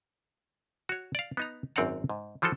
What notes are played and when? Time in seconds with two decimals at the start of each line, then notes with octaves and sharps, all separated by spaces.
0.89 F#4 C#5
1.15 D5 F5
1.37 B3 D#4 A#5
1.76 G#1 F#2 C4 D5 F#5 A#5
2.09 G#2
2.42 E3 F3 F4 F#4 A4